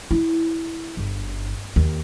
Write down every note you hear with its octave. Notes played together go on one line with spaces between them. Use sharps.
E4
G1
D#2